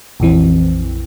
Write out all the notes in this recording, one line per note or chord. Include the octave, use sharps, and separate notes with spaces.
A#1 F2 E3 C4